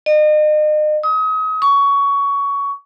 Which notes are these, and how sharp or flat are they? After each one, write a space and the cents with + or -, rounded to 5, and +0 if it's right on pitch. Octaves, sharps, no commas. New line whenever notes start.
D#5 -40
D#6 +35
C#6 +20